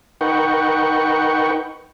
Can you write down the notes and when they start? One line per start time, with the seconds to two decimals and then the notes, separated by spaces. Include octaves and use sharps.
0.21 D#4 A#4 B4 F#5 G5 C#6